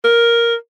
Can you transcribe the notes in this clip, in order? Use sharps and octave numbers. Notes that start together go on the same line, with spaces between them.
A#4